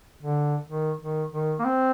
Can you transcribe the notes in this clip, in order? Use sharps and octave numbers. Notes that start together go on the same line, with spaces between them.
D3
D#3
D#3
D#3
A#3
C4